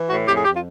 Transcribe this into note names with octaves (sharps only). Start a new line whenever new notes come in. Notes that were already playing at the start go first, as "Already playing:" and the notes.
Already playing: E3
A2 F#4
F2 G4
G#4
F2 G4
F4